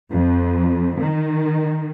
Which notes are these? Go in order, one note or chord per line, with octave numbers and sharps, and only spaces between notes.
F2
D#3